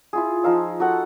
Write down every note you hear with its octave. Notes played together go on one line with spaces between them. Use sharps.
E4 F4 G#4
F3 D#4 F5 E6
F#4 A4 F#5